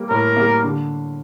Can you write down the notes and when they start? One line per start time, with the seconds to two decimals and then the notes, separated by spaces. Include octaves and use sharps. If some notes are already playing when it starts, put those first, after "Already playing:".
Already playing: G3 A#3
0.10 A2 A#4
0.37 G3 A#3
0.63 D3